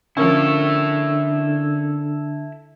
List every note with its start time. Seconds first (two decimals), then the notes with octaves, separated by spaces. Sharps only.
0.17 D3 F3 A#3 C#4 E4 A4